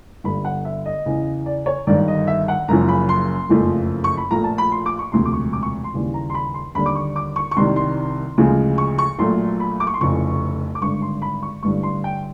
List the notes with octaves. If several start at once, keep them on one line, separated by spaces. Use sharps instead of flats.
G1 G2 D3 G3 B5
F#5
E5
D#5
E2 C#3 E3
D5
C#5
G1 G2 D#3 G3 D5
D#5
E5
F#5
F#1 F#2 C#3 F3 A#5
B5
C6
F#1 F2 C#3 F3 A3
C#6
B5
A#1 A#2 F3 A3 A#5
A5
B5
C6
D6
C#6
E1 D2 C3 F3 C6
D6
C#6
D6
C#6
C6
D#2 C#3 E3 G3
A#5
C6
B5
C6
D#2 D3 G3 B5
D6
C#6
D6
C#6
C#6
C2 C3 D#3 G3 C6
C6
D2 C#3 F3 G#3
C#6
C#6
A#1 A#2 F#3 A3 C6
B5
D6
C#6
C6
F1 F2 C#3 E3 C#6
D6
G#1 G2 D3 C#6
C6
B5
C#6
A1 G2 D3 G3 C#6
C6
G5